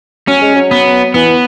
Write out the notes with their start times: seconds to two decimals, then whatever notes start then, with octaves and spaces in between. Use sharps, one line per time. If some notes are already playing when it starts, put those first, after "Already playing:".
0.28 F#3 C#4
0.41 G#3
0.55 F#3
0.71 B3
1.14 E3 B3